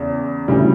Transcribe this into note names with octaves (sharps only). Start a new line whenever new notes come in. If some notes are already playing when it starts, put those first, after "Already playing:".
Already playing: E2 C#3
D2 C#3 E3 G3